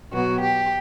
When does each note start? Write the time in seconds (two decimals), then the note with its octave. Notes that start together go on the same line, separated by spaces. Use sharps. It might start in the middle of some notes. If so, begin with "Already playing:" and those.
0.13 B2 F#3 B3 F#4
0.41 G4